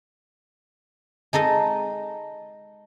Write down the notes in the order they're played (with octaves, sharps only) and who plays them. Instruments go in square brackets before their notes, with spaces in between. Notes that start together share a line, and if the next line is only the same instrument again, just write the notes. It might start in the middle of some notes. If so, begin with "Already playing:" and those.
[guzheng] G#3 D#4 A4 D#5